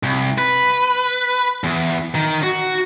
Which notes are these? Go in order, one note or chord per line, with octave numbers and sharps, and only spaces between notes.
C2
B4
E2
D#3
F#4